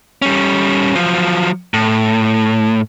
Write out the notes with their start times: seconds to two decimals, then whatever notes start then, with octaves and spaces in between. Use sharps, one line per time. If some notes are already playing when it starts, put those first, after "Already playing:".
0.22 G3 C#4
0.95 F3 F#3
1.74 A2